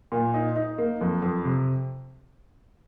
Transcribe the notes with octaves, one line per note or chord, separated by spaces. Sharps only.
A#2
D#4
D#4
A#3
F2
F2
C3